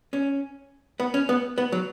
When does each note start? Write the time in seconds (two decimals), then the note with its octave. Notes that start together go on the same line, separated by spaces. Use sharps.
0.13 C#4
1.00 B3
1.14 C#4
1.29 B3
1.58 B3
1.72 F#3